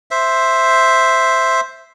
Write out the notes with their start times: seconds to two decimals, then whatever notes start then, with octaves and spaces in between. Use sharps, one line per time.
0.11 C5 E5